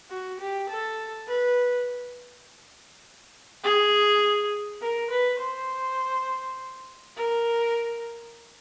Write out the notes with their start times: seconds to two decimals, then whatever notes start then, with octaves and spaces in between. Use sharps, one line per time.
0.10 F#4
0.40 G4
0.69 A4
1.28 B4
3.64 G#4
4.82 A#4
5.11 B4
5.40 C5
7.17 A#4